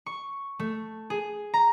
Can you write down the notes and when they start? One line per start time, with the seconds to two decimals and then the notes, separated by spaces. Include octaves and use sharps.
0.06 C#6
0.59 A3
1.10 G#4
1.54 A#5